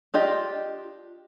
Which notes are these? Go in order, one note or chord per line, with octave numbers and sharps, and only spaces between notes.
D4 F4 G4 D#5